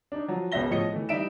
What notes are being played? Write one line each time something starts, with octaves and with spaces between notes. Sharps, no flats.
D4 D#4
F3 F#3
E1 C#2 C#5 E5 A#6 G7
A2 F3 C#5 D#5 C#7 G7
E3 A3
E3 G3 D#4 E5 D7 E7